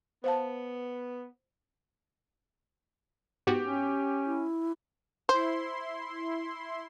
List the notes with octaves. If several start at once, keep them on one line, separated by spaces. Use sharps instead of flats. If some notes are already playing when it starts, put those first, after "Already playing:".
B3 C5 F5 A5
G#2 B3 F#4 G4
C#4
E4
E4 C5 C6